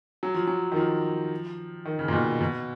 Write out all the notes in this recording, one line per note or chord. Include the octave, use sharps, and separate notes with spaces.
F#3
F3
F#3
D#3
F3
D#3
C#3
A#2
B2
B2